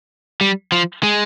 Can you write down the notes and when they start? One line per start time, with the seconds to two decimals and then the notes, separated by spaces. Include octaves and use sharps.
0.41 G3
0.72 F3
1.03 G#3